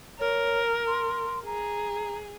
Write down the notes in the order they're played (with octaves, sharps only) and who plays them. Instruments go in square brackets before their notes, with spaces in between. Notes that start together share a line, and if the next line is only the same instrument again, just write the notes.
[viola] A#4 [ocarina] C#5
[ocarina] C6
[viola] G#4 [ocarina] A#5